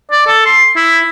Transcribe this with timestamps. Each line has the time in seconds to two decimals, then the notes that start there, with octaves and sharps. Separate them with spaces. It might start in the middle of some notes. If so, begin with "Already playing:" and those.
0.11 D5
0.27 A4
0.46 C6
0.76 E4